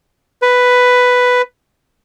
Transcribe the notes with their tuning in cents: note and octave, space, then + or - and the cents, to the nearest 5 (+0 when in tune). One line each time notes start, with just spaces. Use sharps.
B4 +5